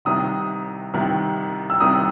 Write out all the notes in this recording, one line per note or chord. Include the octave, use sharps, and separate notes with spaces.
C2 C3 D#3 D#6
C2 C3 D#3
E6
C2 C3 D#3 D#6